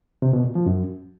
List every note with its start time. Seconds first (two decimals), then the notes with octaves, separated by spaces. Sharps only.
0.22 C3
0.33 B2
0.44 A#2
0.55 F3
0.66 F#2